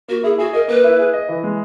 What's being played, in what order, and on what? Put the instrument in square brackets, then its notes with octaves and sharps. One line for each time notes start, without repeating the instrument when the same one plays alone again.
[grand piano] A#3 [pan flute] F#4
[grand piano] E4 [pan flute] G#4
[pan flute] F#4 [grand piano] G#4
[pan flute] A#4 [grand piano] D#5
[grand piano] A#3 [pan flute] B4
[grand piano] E4
G#4
D#5
E3
G#3